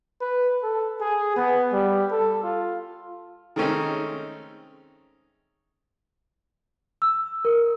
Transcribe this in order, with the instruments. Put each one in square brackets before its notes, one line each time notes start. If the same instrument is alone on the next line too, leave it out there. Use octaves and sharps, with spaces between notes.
[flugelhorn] B4
A4
G#4
B3
G3
A4
F4
[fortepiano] D#3 G#3 A3 C4 C#4 D#4
[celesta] E6
A#4